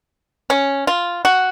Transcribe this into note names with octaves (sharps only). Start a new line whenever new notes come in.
C#4
F4
F#4